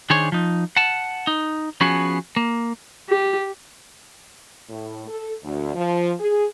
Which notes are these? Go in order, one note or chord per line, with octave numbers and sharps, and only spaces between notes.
D#3 D4 G#4 C5 C#5
F3 D#4
F#5 A5
D#4
F3 B3 C#4 F#4 G#4
A#3
G4
A2
A4
D2
F3
G#4